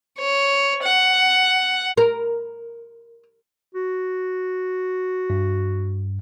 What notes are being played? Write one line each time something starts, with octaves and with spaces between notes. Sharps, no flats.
C#5
F#5
A#4
F#4
G2